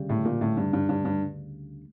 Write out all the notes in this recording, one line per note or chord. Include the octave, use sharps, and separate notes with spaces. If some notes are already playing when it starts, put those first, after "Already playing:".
Already playing: D2 C#3 G3
A2
A#2
A2
G2
G2
G2
G2